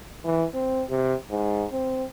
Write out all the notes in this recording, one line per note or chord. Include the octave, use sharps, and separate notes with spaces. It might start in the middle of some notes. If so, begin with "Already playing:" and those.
E3
C4
C3
G#2
C4